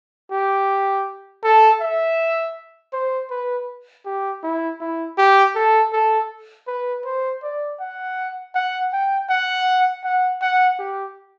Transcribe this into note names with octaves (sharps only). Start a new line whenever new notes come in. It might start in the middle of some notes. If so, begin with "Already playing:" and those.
G4
A4
E5
C5
B4
G4
E4
E4
G4
A4
A4
B4
C5
D5
F#5
F#5
G5
F#5
F#5
F#5
G4